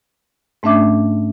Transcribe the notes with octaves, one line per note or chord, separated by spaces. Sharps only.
G#2 A3 C#4 D4 E5 D6